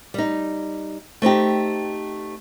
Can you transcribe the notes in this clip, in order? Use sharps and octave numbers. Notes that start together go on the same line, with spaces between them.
G3 D#4
A3 C4 D#4 G4